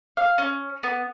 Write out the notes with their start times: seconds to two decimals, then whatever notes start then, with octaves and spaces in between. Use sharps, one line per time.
0.17 F5
0.38 C#4
0.83 B3